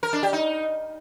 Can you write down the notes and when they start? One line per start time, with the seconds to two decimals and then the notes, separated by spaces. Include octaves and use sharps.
0.03 A#4
0.13 D4
0.23 G4
0.33 D#4